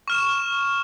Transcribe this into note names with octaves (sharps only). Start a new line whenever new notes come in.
C#6 F6 E7